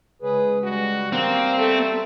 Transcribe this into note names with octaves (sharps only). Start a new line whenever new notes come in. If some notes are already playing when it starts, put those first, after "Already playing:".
C#3 G#3 G#4 B4
G3 F#4
A#3 C4
A3 A4